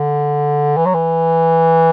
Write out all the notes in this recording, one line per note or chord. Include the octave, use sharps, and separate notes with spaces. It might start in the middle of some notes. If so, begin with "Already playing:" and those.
Already playing: D3
E3
F#3
E3